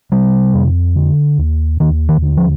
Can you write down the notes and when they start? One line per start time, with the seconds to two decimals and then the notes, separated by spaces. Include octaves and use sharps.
0.12 C3 G3
0.54 F2
0.96 D3
1.38 D#2
1.80 D#2 D#3
2.09 D#3
2.22 D3
2.37 F3